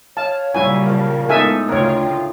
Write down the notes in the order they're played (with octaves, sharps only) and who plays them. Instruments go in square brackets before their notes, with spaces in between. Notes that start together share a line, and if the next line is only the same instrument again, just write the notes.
[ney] C#5 [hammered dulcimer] F5 [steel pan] A5
[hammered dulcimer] A#2 F#3 [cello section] C#3 G3 [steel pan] E4 G#5
[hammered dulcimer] F3 F5 [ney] A#4
[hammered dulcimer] A2 D#4 [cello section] G#3 B3 [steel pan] A4 E5 G#5
[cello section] D2 C#3 F4 [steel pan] A#4 C#5 [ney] G5